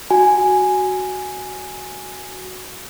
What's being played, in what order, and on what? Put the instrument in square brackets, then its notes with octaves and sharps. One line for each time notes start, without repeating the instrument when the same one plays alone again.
[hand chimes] F#4 G#5